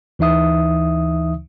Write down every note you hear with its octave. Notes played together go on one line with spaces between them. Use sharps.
D2 E3 D#4 E5 D#6